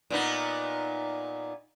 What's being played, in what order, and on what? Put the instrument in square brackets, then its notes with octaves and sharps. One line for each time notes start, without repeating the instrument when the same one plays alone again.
[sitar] A#2 B3 D#4